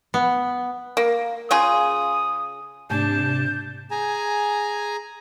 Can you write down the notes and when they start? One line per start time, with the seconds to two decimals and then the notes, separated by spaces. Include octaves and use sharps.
0.14 B3
0.97 A#3
1.51 C#3 F4 G#4 D#6
2.90 G#2 C3 A3 D4 A5 G6
3.91 G#4 G#5 A#5